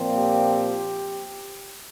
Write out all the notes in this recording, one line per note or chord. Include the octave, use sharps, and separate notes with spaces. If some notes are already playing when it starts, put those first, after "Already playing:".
Already playing: A#2 F3 C4
G4